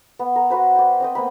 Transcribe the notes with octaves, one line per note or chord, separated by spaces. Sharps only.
B3
A#4
B3 F#4 B4 C5
D5 G5
C4 D#5 G5
A#3 B3 B5